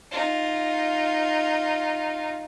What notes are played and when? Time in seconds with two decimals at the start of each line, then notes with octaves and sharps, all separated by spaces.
0.12 D#4 F4